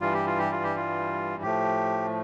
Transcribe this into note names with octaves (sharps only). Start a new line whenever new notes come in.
G2 E3 G3 F4
G4
F4
G4
F4
G4
F4
A2 F3 A3 G4